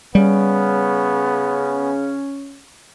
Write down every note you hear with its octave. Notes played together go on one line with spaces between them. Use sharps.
C#3 G3 B3 C#4